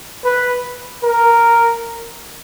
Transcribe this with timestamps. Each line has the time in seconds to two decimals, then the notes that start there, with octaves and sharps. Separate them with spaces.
0.24 B4
1.03 A#4